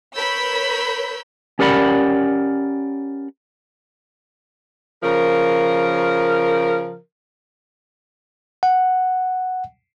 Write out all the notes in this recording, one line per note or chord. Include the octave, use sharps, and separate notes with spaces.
A#4 B4 C#5 B5 E6 G6
C#4 G4 A#4 D5 F#5 B5
C#3 F3 A#4
F#5